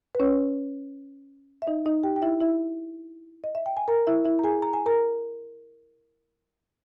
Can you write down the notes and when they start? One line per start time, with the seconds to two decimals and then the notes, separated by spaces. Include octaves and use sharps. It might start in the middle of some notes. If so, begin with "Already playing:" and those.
0.15 B4
0.20 C#4 C#5
1.62 E5
1.67 D#4 D#5
1.86 D#4 D#5
2.03 G4 G5
2.16 G5
2.22 E4 E5
2.41 E4 E5
3.44 D#5
3.55 E5
3.66 G5
3.77 G#5
3.88 A#4 A#5
4.07 E4 E5
4.25 E4 E5
4.39 A#5
4.44 G#4 G#5
4.62 A#5
4.73 G#5
4.86 A#4 A#5